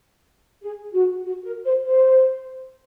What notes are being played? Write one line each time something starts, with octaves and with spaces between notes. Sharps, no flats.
G#4
F#4
F#4
A#4
C5
C5